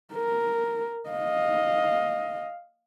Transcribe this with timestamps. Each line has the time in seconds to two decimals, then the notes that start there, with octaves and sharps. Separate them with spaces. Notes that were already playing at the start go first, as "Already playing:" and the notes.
0.14 A#4
1.10 D#5 F5